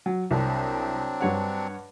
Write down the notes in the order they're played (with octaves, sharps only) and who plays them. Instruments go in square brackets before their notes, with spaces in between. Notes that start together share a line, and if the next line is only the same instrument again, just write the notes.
[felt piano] F#3
[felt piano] C2 [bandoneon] F#3 C4 D4
[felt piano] G2 C#5 F#5